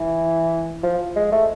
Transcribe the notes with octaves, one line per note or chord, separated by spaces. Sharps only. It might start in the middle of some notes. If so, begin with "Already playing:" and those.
Already playing: E3
F3
G#3
A3